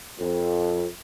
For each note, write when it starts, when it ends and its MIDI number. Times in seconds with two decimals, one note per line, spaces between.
0.19 0.87 41